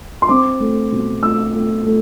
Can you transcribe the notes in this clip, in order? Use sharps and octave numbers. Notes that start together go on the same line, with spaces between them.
C6
C4 D6
A3
B2
A3 E6
A3
A3